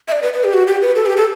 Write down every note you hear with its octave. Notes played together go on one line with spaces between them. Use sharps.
E5
D5
B4
B4
G4
F#4
G4
B4
A4
G4
A4